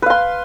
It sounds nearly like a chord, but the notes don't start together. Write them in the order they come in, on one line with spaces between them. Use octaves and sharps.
B4 F5 C6